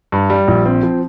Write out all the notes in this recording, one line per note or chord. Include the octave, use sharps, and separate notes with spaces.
G2
G3
A#1
C4
F3